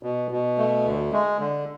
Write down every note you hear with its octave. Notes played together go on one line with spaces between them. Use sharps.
B2
B2
A3
D2
G#3
D3